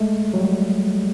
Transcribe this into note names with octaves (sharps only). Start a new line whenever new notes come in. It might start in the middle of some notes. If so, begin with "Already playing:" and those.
Already playing: G#3 A3
F#3
G3